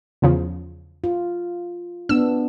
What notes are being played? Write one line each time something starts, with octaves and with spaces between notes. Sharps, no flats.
E2 C#3 F3
F4
B3 D4 E6